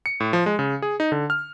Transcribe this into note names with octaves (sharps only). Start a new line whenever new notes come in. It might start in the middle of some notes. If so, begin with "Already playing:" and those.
C#7
A2
F3
G#3
C#3
G#4
D#4
D3
F6